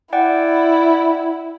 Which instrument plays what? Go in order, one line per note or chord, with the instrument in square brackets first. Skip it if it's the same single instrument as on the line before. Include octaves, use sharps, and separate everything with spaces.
[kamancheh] E4 [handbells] D5 F#5 G5